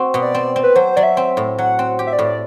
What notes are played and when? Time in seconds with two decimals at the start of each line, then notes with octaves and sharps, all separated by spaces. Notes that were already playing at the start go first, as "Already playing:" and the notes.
Already playing: C4 F#4
0.14 B2
0.22 D5
0.34 C4
0.56 C4
0.63 B4
0.76 F#3 C5
0.96 F#3 D5
1.03 E5
1.17 C4
1.37 A2
1.58 F#3 F#5
1.79 C4
1.99 G4
2.07 E5
2.13 D5
2.19 A2